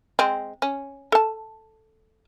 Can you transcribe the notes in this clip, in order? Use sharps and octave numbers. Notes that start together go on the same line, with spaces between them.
G#3 C4
C#4
A4 A5